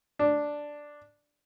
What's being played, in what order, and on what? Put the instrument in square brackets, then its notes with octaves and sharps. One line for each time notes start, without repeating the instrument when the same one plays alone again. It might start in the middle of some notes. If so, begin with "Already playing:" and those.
[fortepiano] D4